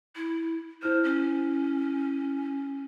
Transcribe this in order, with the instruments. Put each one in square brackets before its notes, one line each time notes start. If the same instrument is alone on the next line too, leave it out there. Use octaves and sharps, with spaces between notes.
[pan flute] E4
[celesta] E4 F6 [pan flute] C5
[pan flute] C#4